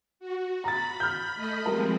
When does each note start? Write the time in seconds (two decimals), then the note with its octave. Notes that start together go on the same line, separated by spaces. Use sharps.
0.19 F#4
0.64 A#5 B5 A6
1.00 F6 G6
1.35 A3 D#5 B5
1.66 F3 G3 G#3 C4 A#4